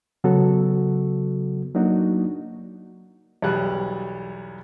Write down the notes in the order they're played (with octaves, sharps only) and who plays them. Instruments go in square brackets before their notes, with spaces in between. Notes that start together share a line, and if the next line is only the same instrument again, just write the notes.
[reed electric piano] C#3 F#3 B3 F#4 A4
F#3 A#3 D4 D#4 F#4
[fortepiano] B1 E2 G3 F#6